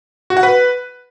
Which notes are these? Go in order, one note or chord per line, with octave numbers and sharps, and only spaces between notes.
F#4
F#5
B4